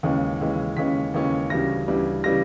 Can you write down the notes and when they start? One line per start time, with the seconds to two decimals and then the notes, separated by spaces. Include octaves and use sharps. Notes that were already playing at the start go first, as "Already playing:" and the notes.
0.03 D#2 C#3 E3 G#3 C#4
0.41 D#2 C#3 E3 G#3 C#4
0.77 D#2 C#3 E3 G#3 C#4 B6
1.14 D#2 C#3 E3 G#3 C#4
1.50 D2 C#3 E3 G3 A#6
1.88 D2 C#3 E3 G3
2.24 C#3 E3 G3 A#6